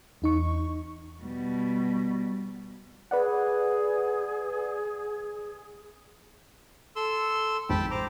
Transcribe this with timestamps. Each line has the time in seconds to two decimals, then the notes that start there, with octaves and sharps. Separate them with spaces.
0.22 E2 D#4 C#6
1.22 B2 G3
3.11 G#4 B4 D5 F#5
6.96 A4 C6 E6
7.69 A1 F2 G#2 G5 A5 B5
7.91 C5 A#5 D6